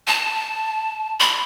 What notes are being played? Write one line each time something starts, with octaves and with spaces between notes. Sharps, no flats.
A5
B5